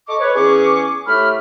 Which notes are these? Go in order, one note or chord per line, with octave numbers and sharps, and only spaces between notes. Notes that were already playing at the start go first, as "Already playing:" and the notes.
A4 D#5 C#6 D6
B4 C#5
E2 E3 C#4 G#4 C#6 D6
A2 A3 G4 B5 F6